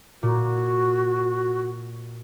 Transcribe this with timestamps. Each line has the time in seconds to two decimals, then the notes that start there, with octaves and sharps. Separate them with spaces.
0.23 A#2 F#4